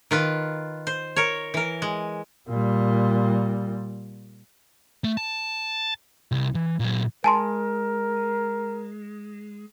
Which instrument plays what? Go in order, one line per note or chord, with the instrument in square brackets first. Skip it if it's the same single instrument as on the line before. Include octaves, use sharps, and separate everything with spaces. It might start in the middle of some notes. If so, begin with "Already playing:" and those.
[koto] D#3 F4 B4
C5
A#4 C#5
E3 A#4
G#3
[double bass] A#2 G3
[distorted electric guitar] A3
A5
C2
E3
A#2 F#3
[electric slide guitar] G#3 [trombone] A#4 [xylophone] G#5 A5 C6